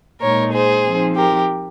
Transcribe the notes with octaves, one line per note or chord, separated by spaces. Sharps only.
A#2 G#3 D#4 A#4 C#5
G#4 C5
F3 C4 D#4
G4 A#4